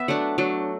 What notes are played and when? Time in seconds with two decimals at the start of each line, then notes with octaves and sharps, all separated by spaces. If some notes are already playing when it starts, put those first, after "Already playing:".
Already playing: B3 E5
0.08 F#3 A3 D4 F#5
0.38 F#3 A3 D4